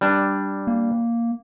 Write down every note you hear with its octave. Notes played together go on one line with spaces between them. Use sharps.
G3 D4
A#3